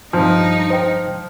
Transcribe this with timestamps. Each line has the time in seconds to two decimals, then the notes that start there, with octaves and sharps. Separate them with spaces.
0.13 G2 F3 D#4
0.70 C5 G5